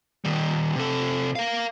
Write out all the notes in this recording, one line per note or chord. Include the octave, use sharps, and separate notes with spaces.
D#3 G3
C3 A4
A#4 F5